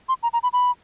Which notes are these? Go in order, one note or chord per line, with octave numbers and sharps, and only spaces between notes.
C6
A#5
A#5
B5
B5